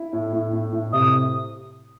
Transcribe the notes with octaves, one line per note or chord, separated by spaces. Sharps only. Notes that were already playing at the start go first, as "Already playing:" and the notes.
Already playing: E4
A2
A2
A2
A2
C3 D#6